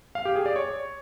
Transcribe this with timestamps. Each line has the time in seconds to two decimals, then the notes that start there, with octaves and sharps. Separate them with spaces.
0.15 F5
0.25 G4
0.36 G#4
0.46 D5
0.56 C#5